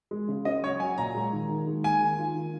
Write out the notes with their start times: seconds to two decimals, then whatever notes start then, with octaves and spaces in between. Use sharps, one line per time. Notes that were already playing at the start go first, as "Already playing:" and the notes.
0.11 G#3
0.28 C#3
0.45 C#4 D#5
0.63 F#3 C#5
0.80 F#3 G#5
0.98 A#2 A#5
1.15 G#3
1.33 D#3
1.49 D#3
1.67 G#3
1.84 A#3 G#5
2.02 D#3
2.18 F4
2.35 D#3